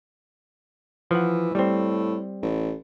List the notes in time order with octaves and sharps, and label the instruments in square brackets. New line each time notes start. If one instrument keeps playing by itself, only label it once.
[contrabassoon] E3 [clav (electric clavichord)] F3 F#5
[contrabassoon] A2 [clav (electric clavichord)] G3 C4
[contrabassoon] A1